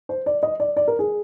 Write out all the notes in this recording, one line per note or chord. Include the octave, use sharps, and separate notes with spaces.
C5
D5
D#5
D5
D5
A#4
G#4